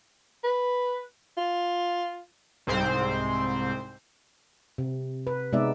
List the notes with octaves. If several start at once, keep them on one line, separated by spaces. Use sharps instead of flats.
B4
F4
C2 G#2 C4 C5
C3
B4
C3 G#3 B3 D#4 D5 E5